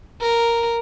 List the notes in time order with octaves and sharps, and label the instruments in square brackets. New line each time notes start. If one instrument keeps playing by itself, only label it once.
[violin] A#4